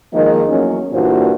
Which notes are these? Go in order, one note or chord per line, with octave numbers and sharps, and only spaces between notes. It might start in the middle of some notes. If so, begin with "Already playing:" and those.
D#3 F3 G#3 A#3 D#5
E2 F#3 A#3 C#4
G2 A#2 E3 F4 F#4 C5